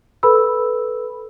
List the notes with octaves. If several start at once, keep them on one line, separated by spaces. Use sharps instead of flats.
A4 B4 B5 E6